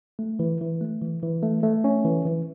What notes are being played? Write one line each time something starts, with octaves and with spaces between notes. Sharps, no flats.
A3
E3
E3
A3
E3
E3
A3
A3
C#4
E3
E3